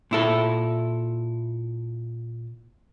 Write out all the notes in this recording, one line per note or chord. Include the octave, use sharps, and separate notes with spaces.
A#2 E4 A4